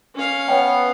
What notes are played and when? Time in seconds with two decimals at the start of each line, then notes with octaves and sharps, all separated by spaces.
0.15 C#4 F5
0.48 B3 C#5 G5